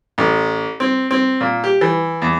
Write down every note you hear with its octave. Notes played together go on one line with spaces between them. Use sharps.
A1
C4
C4
A#2
G4
E3
E2